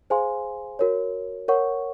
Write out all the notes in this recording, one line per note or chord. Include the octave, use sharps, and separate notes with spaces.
G#4 C5 F5 G#5 C6
F#4 A#4 C#5
A#4 C#5 F#5 C#6